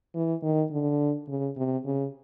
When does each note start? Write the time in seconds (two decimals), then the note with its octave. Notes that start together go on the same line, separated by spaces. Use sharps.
0.15 E3
0.43 D#3
0.71 D3
1.28 C#3
1.57 C3
1.85 C#3